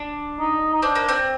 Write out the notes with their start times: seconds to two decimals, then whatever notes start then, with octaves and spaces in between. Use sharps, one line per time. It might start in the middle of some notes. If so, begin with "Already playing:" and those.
Already playing: D4
0.40 D#4
0.74 D#4
0.82 C4 D4
0.95 A#3
1.09 C4